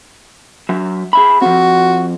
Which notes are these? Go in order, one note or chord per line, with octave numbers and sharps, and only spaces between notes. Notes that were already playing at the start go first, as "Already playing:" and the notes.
F#3 E5
G#4 E5 B5
F3 C4 F#4